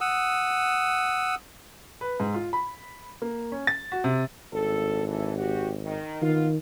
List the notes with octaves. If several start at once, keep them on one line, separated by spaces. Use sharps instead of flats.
F#5 D#6 E6
B4
G#2
F4
B5
A#3
C#4
A6
F#4
C3
G#1 G2 A4
E3 A4
F#4 G4
D#3
D#3 A#3 B3 F4